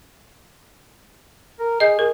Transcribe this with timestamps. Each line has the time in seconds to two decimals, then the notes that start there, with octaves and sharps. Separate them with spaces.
1.59 A#4
1.80 G#4 D#5 G6
1.99 G#4 A#4